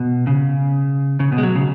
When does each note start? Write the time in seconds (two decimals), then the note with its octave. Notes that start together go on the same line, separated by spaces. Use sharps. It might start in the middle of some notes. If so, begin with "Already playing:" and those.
Already playing: B2
0.27 C#3
1.20 C#3
1.32 B2
1.38 G#3
1.43 F#3
1.55 C#3